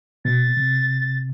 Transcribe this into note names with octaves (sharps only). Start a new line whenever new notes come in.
B2 A6
C3